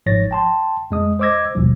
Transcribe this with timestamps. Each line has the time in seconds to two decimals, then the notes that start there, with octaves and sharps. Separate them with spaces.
0.06 G#1 G#2 F3 C#5 A6 A#6
0.31 G5 A5 C6
0.91 F2 G#3 D#6
1.19 C5 D#5 D6 E6 G#6 A#6
1.55 G#1 D#2 B2 F3 G3